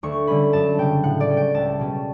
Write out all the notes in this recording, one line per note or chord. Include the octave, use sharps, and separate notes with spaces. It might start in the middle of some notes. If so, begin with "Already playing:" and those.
D2 C#6
D3 G3 C#4 B5
F#2 A5
C#3 G3 G5
A2 F#5
D5
G3 C#4
G5
C#2 A5
B2 G3 C#4